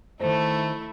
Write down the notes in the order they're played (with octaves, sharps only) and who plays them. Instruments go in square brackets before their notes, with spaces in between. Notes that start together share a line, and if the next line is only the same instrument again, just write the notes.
[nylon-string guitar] D#3 A4 C5 [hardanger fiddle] A3 E4